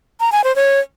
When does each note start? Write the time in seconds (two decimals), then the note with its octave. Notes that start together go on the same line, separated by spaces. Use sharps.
0.20 A#5
0.32 G#5
0.44 C5
0.56 C#5